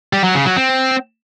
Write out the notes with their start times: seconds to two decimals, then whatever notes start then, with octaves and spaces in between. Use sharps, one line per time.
0.13 G3
0.24 F#3
0.35 C#3
0.46 F#3
0.57 C4